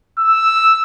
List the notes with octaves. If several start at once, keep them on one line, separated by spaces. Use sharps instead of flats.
E6